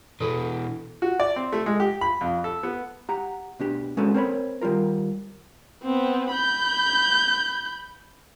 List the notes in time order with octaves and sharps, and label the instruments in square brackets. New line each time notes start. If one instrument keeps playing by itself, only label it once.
[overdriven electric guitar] B2 E3 [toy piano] A4
[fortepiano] F#4
D5
C4
A3
G#3
G4
B5
F2
A4
B3
[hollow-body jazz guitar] G4 F#5 A#5
B2 D4 G4
G#3 C#4 F#4 A4 B4
C4 A#4 C5 C#5 B5
D#3 G3 A#3 F4 A#4
[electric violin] B3 C4
B5 G6